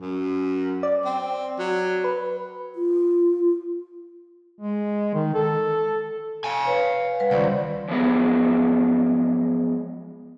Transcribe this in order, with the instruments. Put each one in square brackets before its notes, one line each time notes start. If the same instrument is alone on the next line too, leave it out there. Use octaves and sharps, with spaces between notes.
[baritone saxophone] F#2
[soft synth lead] D5
[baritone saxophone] C4
F#3
[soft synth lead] B4
[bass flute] F4
[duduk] G#3
D#3
A4
[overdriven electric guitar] F5 G#5
[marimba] B4 C#5
G3 B4 F#5
[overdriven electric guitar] C#2 [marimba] D#3 C5 D5
[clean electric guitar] F3 F#3 G#3 B3 G#4 A#4